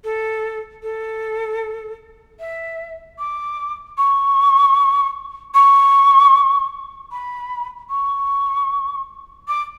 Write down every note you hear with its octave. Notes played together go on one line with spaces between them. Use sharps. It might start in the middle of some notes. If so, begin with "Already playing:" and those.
A4
A4
E5
D6
C#6
C#6
B5
C#6
D6